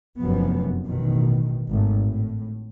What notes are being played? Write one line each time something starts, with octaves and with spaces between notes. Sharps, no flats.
F1 F#2 F3 B3
A1 B2 D#3
G#1 A3
A2